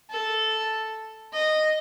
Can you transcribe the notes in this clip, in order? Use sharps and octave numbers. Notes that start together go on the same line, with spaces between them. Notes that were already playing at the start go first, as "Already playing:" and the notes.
A4
D#5